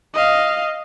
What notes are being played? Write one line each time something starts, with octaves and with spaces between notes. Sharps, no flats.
D#5 F5